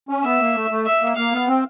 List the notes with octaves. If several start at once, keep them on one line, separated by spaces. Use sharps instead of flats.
C#4
B3 E5
A#3
A3
A3
E5
A#3
A#3 F5
B3
C4